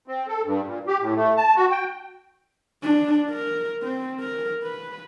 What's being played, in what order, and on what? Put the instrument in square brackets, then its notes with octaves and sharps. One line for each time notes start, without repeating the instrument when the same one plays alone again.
[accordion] C4
A4
G2
A#2
G4
A2
A3
A5
F#4
G5
[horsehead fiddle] D4
A#4
C4
A#4
B4